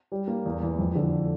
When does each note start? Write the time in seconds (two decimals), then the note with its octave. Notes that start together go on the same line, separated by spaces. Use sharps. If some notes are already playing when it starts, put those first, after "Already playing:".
0.12 G3
0.28 A#3
0.45 E2
0.63 E3
0.79 F2
0.95 D3